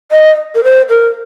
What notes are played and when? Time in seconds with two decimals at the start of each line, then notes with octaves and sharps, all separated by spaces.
0.11 D#5
0.55 A#4
0.64 C5
0.89 A#4